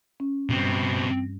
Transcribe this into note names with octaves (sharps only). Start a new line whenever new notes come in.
C#4
G2 B2 G3 C4